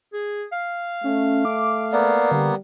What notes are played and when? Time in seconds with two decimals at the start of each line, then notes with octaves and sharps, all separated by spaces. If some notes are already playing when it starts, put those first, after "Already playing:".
0.13 G#4
0.53 F5
1.04 A3 C#4
1.45 D6
1.92 A#3 B3 D5
2.31 D3 G3